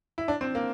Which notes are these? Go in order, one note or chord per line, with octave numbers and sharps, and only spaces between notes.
E4
D4
C4
A#3